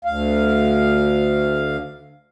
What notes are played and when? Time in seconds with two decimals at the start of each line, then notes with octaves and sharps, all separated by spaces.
0.05 D2 F5